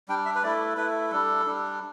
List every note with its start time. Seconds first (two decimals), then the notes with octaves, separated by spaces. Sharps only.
0.08 G3 D4 G5
0.25 E5
0.35 B4
0.43 A3 E4 D5
0.77 A3 E4 B4
1.11 G3 D4 A4
1.46 G3 D4